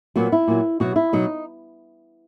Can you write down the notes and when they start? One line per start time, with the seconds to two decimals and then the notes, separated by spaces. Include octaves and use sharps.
0.16 A#2 F#3 B3
0.32 E4
0.48 A#2 F#3
0.80 B2 F#3 F#4
0.96 E4
1.13 B2 F#3 D#4